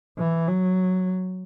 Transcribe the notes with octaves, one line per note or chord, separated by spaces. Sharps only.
E3
F#3